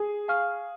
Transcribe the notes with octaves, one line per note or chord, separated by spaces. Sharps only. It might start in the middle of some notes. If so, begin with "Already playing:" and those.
Already playing: G#4
F5 G#5 C#6 F6